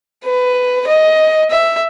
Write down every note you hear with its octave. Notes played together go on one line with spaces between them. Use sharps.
B4
D#5
E5